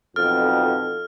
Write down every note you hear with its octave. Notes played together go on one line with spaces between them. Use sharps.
B1 F2 B2 A4 F6